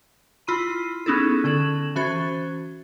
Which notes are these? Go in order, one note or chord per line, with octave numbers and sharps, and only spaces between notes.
E4 F4 B5 C6 D#7
B3 C#4 D#4 E4 G#4 A4
D3 C#4 A4 E7 F#7
E3 C#4 F#4 C5 A6